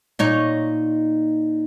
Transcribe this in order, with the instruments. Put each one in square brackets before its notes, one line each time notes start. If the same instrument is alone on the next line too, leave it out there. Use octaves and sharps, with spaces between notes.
[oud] A#2 D#4 C#5